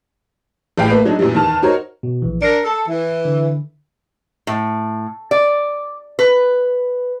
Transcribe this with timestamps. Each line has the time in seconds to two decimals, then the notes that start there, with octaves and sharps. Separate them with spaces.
0.78 A1 A2 G#4 F5 G5 B5
0.90 A3 A#3 B4
1.05 F#3 G#3 D4 D#4
1.19 F#2 A#2 E3 F#3 G3
1.35 E2 D#3 A5 F6
1.62 D#4 F#4 A#4 C5 C#5
2.03 B2
2.22 A#1 E3
2.42 D4 A#4 C7 C#7
2.65 A4
2.87 E3
3.25 D3
4.47 A2
5.31 D5
6.19 B4